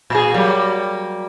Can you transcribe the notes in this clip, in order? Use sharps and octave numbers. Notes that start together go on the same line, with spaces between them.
A#2 G#4
F#3 G3 A#3